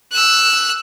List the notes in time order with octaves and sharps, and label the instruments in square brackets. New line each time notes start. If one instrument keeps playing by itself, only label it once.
[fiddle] E6 F#6